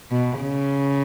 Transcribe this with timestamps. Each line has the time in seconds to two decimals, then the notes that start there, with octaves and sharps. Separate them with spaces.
0.11 B2
0.41 C#3